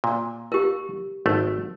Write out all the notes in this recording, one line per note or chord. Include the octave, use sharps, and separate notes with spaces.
A#2
G4 A#4
G#1 A3